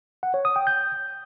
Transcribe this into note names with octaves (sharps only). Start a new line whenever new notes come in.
F#5
C#5
D#6
G5
G6